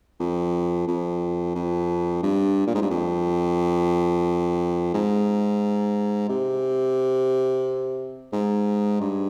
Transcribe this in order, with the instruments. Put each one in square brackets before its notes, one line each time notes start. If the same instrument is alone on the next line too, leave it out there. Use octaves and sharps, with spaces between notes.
[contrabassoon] F2
F2
F2
G2
A#2
G#2
G2
F2
G#2
C3
G#2
G2